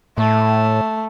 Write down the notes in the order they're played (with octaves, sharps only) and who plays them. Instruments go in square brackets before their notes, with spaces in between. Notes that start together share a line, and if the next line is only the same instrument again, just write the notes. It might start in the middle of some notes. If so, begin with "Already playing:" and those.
[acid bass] A2 [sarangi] A3